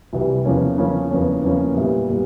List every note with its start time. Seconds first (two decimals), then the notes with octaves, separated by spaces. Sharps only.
0.13 C2 C3 E3 G3
0.45 E2 C#3 F3 A#3 C#4
0.78 E2 C#3 F3 A#3 C#4
1.11 E2 C#3 F3 A#3 C#4
1.44 E2 C#3 F3 A#3 C#4
1.76 A#2 G3 B3 E4
2.10 A#2 G3 B3